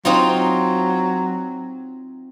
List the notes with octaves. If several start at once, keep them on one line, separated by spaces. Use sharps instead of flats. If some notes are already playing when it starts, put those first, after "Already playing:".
F#3 C4 D#4 F4